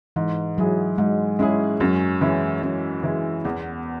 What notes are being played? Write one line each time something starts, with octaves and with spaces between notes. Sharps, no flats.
G#2 E3
F#3 G#3 E4 G#4
G#2 G#3
G#3 C#4 E4 G#4
F#2 C#4
E3 G#3 C#4 E4
F#2 C#4
E3 G#3 E4
E2 B3